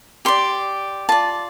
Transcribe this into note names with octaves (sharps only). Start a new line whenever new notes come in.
G4 D5 C6
F4 D5 A5